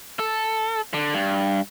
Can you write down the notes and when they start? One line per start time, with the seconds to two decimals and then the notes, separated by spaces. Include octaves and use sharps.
0.19 A4
0.94 D3
1.14 G2